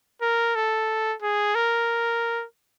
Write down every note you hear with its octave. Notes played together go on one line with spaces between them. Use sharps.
A#4
A4
G#4
A#4